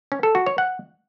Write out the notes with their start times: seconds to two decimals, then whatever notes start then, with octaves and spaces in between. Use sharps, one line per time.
0.12 C#4
0.23 A4
0.35 F#4
0.46 C#5
0.58 F#5